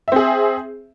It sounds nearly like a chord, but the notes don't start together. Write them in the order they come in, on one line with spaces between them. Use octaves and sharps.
E5 C4 G#4